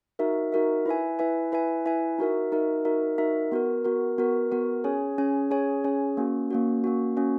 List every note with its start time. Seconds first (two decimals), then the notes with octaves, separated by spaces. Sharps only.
0.19 D#4 F#4 A#4 E5
0.52 D#4 F#4 A#4 E5
0.86 E4 B4 E5 G#5
1.19 E4 B4 E5 G#5
1.52 E4 B4 E5 G#5
1.86 E4 B4 E5 G#5
2.19 D#4 F#4 A#4 E5
2.52 D#4 F#4 A#4 E5
2.85 D#4 F#4 A#4 E5
3.18 D#4 F#4 A#4 E5
3.52 B3 F#4 A#4
3.85 B3 F#4 A#4
4.18 B3 F#4 A#4
4.52 B3 F#4 A#4
4.84 C#4 G#4 C#5 G#5
5.18 C#4 G#4 C#5 G#5
5.51 C#4 G#4 C#5 G#5
5.84 C#4 G#4 C#5 G#5
6.17 A#3 C#4 F#4
6.51 A#3 C#4 F#4
6.84 A#3 C#4 F#4
7.17 A#3 C#4 F#4